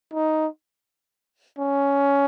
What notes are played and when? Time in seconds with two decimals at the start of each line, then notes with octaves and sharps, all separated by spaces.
0.14 D#4
1.59 C#4